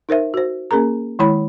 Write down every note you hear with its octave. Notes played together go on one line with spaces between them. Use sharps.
D#4 A#4 C5 E5
F#4 C5
A#3 C#4 G#4 A#4 A#5
D#3 G#3 E4 C#5 B5